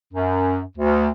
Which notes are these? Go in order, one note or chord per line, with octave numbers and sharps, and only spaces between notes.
F#2
D2